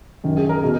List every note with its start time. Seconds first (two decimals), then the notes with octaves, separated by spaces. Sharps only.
0.24 F#2 D#3
0.37 G#4
0.49 A#4
0.62 B2 G#4